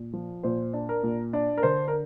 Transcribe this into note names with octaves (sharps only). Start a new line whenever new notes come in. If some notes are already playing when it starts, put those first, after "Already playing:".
Already playing: A#2
F3
A#2 C5
D4
A#4
A#2
D4 D5
A#4
D3 C5
A#4